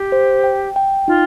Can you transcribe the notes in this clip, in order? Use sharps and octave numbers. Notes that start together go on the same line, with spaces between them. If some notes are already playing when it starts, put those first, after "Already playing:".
Already playing: G4
C5
G5
G5
D#4 F4